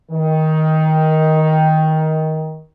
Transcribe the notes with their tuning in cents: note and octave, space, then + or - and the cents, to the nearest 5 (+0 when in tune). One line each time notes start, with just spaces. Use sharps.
D#3 +15